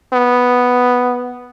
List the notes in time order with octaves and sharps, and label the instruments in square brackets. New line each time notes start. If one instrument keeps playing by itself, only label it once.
[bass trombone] B3